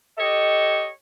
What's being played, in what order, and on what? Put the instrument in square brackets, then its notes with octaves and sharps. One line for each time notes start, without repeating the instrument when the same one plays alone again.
[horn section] G4 A4 C#5 D#5